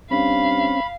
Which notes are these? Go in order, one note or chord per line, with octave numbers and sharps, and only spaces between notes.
G2 C4 C#4 F5 B5